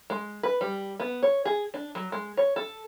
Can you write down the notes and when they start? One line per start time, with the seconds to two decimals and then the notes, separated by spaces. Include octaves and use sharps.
0.10 G#3
0.43 B4
0.61 G3
1.00 B3
1.23 C#5
1.45 G#4
1.74 D4
1.95 F#3
2.12 G#3
2.37 C#5
2.56 A4